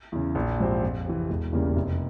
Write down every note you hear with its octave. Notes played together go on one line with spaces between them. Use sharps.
E2 C#3
A#1
G#2 F3 C4 G4
F2
C3 E3
E1
E2 C#3 G3 A#3
F1